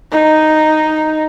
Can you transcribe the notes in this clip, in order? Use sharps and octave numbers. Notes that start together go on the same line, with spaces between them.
D#4